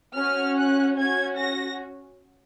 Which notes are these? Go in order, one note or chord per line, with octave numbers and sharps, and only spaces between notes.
C#4 F#4 F6
F#6
C#4 F#4 G#6
A#6